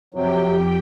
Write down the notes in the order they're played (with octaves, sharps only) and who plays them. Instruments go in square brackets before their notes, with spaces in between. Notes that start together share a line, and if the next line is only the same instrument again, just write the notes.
[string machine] F2 G4 G5 [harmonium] C3 F#3